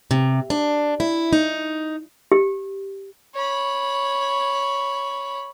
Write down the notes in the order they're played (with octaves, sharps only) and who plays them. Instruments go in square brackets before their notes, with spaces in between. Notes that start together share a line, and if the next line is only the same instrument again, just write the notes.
[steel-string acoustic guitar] C3
D4
E4
D#4
[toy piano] G4
[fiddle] C#5 B5